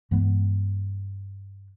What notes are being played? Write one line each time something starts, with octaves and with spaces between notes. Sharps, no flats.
G2 E3 G#3 B3